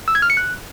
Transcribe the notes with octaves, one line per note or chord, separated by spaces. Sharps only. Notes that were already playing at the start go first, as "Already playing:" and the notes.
E6
G#6
F6
C#7
F#6